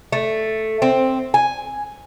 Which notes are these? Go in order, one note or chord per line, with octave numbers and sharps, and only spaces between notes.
A3
C4
G#5